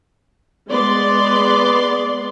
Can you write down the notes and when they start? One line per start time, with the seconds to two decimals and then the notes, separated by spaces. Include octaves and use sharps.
0.68 G#3 B3 D5 C6